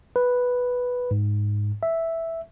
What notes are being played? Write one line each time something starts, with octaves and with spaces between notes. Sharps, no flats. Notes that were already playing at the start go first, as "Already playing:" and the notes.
B4
G#2
E5